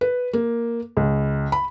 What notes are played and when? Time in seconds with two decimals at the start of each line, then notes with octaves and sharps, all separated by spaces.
0.01 B4
0.33 A#3
0.97 C#2
1.52 B5